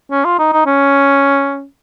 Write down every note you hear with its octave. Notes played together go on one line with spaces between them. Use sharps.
C#4
F4
D#4
D#4
C#4